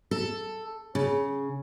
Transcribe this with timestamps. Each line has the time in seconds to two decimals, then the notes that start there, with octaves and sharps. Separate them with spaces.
0.11 A4
0.95 C#3